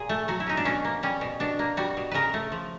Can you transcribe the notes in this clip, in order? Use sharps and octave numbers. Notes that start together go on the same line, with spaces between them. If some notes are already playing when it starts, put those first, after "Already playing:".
Already playing: A#2 G#4
A3
F#3 F#4
E4
C#4 D#4
D4
B2 C#4
A#3
G3 C#4
B2
B2 D4
A#3
G3 F#4
B2
C#3 A#4 B4
A3
F3